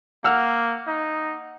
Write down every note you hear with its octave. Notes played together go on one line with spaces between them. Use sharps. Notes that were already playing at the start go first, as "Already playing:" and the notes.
A#3 F#5 E6 F6
D#4